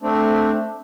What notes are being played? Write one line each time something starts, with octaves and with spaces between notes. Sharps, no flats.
A3 C4 D4